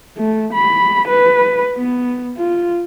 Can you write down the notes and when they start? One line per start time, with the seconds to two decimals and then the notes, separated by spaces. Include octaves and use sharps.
0.17 A3
0.53 B5
1.08 B4
1.77 B3
2.38 F4